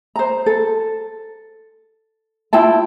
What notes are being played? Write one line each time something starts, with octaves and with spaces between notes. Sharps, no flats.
C5 A#5
A4
E4 F4 G5 A5